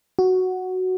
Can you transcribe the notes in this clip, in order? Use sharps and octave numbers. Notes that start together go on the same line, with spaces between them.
F#4